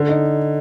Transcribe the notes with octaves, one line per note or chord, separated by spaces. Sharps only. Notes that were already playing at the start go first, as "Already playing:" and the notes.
Already playing: D3
D#4